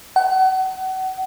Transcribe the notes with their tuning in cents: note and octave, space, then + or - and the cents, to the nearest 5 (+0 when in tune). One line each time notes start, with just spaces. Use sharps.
F#5 +30